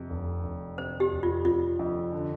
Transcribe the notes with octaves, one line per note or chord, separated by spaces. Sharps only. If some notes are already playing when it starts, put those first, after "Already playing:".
Already playing: F2 C3
F1
F1
C3 C5
G4
F1
F4
F1 F4
F2
D3